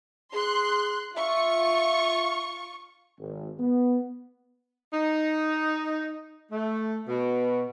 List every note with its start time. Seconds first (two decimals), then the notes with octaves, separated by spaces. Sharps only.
0.34 G#4 C6 F#6
1.16 F4 E5 C#6
3.18 G#1
3.58 B3
4.93 D#4
6.52 A3
7.08 B2